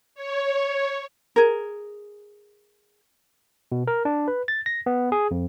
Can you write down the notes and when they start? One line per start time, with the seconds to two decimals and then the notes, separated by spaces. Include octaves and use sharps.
0.15 C#5
1.36 G#4 A#4
3.72 B2
3.87 A#4
4.05 D4
4.28 B4
4.48 A6
4.66 A#6
4.86 B3
5.12 G#4
5.31 F2